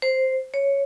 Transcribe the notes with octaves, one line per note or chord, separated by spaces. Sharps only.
C5
C#5